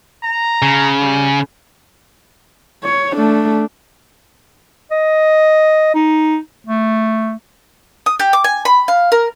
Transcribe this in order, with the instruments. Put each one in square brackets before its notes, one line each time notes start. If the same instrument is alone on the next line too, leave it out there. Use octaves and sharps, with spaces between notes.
[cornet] A#5
[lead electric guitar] C#3
[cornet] G3
[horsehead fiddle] C#5
A3 D4
[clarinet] D#5
D#4
A3
[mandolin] D#6
G4
D6
G#5
B5
F5
A#4